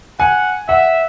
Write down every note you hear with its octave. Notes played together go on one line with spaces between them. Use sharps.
F#5 G#5
E5 F#5